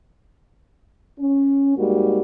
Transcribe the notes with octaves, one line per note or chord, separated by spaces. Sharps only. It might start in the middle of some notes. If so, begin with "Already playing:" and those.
C#4
G#2 G3 G#3 A#3 F#4 G4